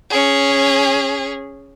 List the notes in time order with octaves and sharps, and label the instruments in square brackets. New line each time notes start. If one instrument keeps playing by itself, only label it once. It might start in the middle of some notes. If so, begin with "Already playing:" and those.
[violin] C#4 G#4